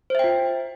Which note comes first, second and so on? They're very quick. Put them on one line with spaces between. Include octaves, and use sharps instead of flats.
C5 E5 G5 F4